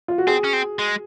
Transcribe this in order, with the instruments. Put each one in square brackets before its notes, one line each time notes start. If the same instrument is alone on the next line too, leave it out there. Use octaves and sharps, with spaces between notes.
[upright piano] F4
F#4
[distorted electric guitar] C4 [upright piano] G#4
[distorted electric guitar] C#4
C4
G#3